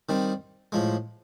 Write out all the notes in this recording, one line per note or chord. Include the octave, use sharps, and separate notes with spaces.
D#3 G3 C4
A2 F3 G#3